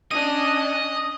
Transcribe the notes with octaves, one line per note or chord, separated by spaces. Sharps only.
C#4 D4 D#5 D#6